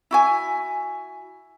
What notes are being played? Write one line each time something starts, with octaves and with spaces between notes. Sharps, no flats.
E4 F#4 G#5